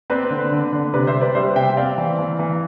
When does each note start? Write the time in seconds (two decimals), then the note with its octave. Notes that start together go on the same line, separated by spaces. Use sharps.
0.10 C4 B4 D5
0.31 D3
0.52 D3
0.73 D3
0.94 C3 B4 D5
1.07 C5 E5
1.14 G3
1.21 B4 D5
1.35 G3 C5 E5
1.56 C3 E5 G5
1.77 C4 D5 F5
1.98 E3
2.19 E3
2.39 E3